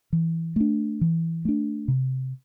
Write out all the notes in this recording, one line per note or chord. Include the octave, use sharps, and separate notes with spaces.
E3
A3 D4
E3
A3 D4
C3